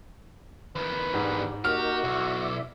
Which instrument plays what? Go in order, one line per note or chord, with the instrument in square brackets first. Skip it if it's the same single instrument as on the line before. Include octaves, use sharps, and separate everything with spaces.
[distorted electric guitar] E2 D#3 [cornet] B4
[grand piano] G#2 [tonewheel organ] D4 G4
[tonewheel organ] A#3 D#4 A#4 [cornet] F#4 [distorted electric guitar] G4 [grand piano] F6
[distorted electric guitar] B1 [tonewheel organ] E4 D5 E5